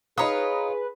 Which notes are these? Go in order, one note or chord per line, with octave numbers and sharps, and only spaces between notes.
D#4 F4 G#4 B4 C#5 A#5 D#6